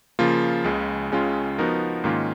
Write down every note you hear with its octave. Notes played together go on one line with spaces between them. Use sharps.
C#3 F3 A#3 F4
C#2 C#3 G#3
C#2 C#3 G#3 C#4 F4
F3 B3 D#4 F#4 A#4
G#2 D#3 A#3 C#4 F4